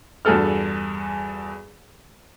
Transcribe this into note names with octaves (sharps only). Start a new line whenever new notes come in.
E2 G2 F#4 G#4 A4 F6